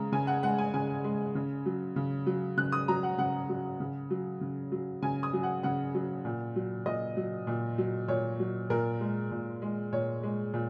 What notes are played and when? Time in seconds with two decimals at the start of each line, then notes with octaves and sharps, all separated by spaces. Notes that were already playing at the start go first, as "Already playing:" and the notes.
Already playing: C#3 G#3 A#5
0.12 C#3 G#5
0.27 F#5
0.43 G#3 F#5
0.58 G#5
0.74 C#3 G#5
1.04 G#3
1.35 C#3
1.66 F#3
1.96 C#3
2.26 F#3
2.57 C#3 F#6
2.72 D#6
2.88 F#3 A#5
3.03 F#5
3.18 C#3 F#5
3.49 F#3
3.80 C#3
4.10 F#3
4.41 C#3
4.72 F#3
5.02 C#3 G#5
5.23 D#6
5.33 F#3
5.43 F#5
5.63 C#3 F#5
5.94 F#3
6.25 A#2
6.56 F#3
6.86 A#2 D#5
7.17 F#3
7.47 A#2
7.78 F#3
8.08 A#2 C#5
8.39 F#3
8.70 A#2 A#4
9.01 G#3
9.31 A#2
9.62 G#3
9.93 A#2 C#5
10.23 G#3
10.54 A#2